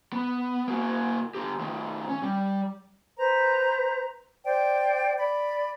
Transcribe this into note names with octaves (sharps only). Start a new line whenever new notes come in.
B3
A#3 F#4
D3 G4
D#3 A3
C#4
G3
B4 C5 A#5
C5 D5 G5
D5 B5